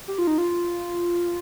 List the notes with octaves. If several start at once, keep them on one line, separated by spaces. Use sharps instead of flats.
G4
F4
D#4
F4